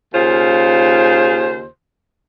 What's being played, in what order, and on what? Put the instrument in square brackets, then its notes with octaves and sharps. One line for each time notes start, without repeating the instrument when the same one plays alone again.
[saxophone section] D#2 C#3 F4 C5